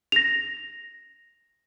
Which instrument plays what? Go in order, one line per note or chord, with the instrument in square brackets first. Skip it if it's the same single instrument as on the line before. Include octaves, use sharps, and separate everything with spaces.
[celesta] A#6 F7